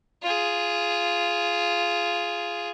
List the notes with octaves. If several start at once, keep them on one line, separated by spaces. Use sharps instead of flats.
F4 G#4